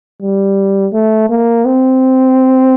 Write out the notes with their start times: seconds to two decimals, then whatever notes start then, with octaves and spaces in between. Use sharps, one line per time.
0.22 G3
0.93 A3
1.30 A#3
1.65 C4